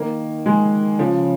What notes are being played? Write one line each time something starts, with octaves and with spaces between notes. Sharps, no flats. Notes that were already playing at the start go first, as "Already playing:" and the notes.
Already playing: D#3 A#3
G#3
C#3 F3